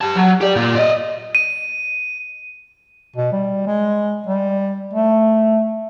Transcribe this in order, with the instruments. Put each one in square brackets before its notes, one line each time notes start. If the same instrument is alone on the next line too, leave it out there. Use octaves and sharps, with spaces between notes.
[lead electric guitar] G4 A5
F#3
G4 D5
A#2 F4
D5 D#5
[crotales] D#7
[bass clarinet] B2
G3
G#3
G3
A3